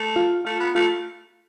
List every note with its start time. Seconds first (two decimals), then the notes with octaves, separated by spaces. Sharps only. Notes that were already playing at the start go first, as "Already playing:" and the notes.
Already playing: A3
0.16 F4
0.45 A3 F4
0.60 B3
0.75 A3 F4